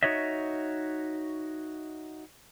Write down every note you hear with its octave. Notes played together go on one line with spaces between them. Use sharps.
D#4 F#4 C#5 D#5 E5